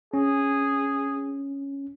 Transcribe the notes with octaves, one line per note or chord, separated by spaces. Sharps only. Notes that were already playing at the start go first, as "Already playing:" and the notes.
C#4 G#4